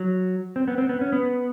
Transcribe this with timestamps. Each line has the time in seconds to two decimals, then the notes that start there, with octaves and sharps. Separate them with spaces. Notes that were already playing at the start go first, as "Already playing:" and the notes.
Already playing: F#3
0.56 C4
0.68 B3
0.78 C4
0.89 B3
1.01 C#4
1.12 B3